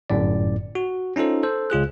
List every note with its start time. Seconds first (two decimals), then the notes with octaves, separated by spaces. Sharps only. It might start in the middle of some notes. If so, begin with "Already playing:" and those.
0.10 G1 F#2 A2 D5
0.75 F#4
1.16 C#4 D#4 F4 A4 C5
1.43 A4 C5
1.70 C#2 F4 G#4 F#6